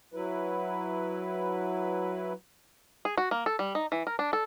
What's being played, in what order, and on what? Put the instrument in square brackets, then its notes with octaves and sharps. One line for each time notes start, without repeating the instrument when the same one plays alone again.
[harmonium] F#3 E4 B4
[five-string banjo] G#4
F#4
A#3
A4
G3
D#4
E3
A#4
D4
A4